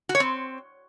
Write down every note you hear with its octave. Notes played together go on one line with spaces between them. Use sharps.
F#4
C#5
C4